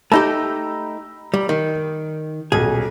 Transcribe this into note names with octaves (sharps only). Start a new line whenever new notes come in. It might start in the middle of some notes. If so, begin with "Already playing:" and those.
A3 D#4 G4 A#5 B5 E6
G3
D#3
D#1 B1 G#4